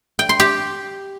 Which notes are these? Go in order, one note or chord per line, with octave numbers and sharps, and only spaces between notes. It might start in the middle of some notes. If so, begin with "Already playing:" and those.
G5
C6
G4